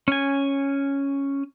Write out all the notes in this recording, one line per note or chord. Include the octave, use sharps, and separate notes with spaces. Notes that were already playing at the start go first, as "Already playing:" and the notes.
C#4 G#5